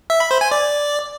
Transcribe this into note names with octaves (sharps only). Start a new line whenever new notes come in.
E5
B5
C5
G#5
D5